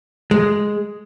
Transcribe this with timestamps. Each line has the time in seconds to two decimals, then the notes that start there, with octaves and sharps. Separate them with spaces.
0.31 G#3